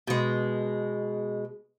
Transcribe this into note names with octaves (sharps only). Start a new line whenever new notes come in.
B2 G#3